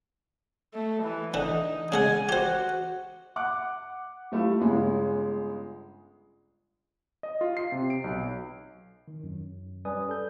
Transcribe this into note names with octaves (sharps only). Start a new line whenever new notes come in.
A3
E3
D3 E3 D#4
C#3 G#3 F#5 G#5
F#4 G4 C5
F#5 D6 F#6
G3 A3 E4 F4
G1 C#3 G#3
D#5
F4
C7
C3
D7
B1
D#3
F#2
G3 C#4 B4 D5 G#5 D#6
A4 G6